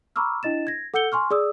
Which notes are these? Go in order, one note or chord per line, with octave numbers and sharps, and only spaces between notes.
A#5 B5 C#6 D6 E6 F6
D4 E4 D#5 A6 E7
G#6 A#6
A4 F#5 E6 G6 C#7 G7
G#5 C6 C#6 F6
G#4 D5 D#6 E6